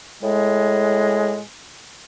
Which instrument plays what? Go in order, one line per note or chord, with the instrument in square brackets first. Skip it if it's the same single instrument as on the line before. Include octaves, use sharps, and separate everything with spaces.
[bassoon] A2 [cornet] G#3